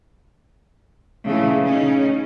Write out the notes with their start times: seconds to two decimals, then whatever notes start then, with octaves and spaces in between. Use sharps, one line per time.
1.25 A#2 C#3 E3 A3
1.62 C#3 C#4 D#4